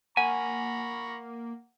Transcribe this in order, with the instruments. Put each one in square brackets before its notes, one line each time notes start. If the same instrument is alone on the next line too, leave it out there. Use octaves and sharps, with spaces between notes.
[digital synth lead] A#3 [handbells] F#5 [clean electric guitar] G#5 [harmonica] A#5 B5 C#6